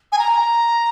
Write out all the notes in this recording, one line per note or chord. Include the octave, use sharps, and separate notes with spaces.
G#5
A#5